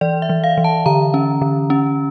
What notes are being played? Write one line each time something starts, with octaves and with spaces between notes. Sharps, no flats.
E3 D5
E5
E3
F5
E3
A5
D3 A#5
C#4
D3
C#4